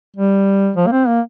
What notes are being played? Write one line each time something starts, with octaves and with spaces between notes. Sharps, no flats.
G3
F3
A#3
C4
A#3